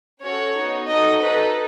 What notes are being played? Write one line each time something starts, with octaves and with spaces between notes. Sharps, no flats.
C#4 F#4 A4 C#5
B3 D#4 F#4
D#4 F#4 A4 D#5
D#4 A4 B4